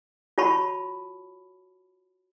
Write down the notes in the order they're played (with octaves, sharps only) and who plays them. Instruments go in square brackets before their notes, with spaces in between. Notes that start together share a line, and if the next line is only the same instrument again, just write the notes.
[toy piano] F4 F#4 C#5 A5 B5 C#6